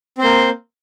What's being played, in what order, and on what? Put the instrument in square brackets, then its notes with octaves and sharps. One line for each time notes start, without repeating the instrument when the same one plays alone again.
[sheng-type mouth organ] C4
C5
A#3